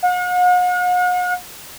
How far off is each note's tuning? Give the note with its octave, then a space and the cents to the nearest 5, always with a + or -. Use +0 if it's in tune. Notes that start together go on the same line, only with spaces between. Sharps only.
F#5 -45